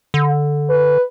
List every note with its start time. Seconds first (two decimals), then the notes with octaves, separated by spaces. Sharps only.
0.14 D3
0.69 B4